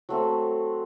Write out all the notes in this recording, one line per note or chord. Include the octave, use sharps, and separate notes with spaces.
F#3 A3 C4